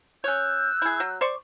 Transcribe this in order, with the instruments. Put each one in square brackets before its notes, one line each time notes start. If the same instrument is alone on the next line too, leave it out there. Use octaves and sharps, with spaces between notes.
[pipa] C#4 C#5 [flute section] E6 F#6 G6
[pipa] E4 G#4
F#3
C5 D5 C#6